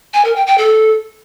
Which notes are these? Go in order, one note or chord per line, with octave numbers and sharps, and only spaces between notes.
G#5
A#4
G5
G5
A4